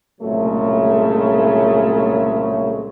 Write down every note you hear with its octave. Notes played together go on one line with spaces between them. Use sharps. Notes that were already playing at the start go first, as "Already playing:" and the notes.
C2 A#2 C#3 F#3 G#3 A3